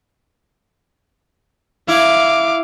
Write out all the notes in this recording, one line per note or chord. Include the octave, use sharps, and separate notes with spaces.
E4 F5 D6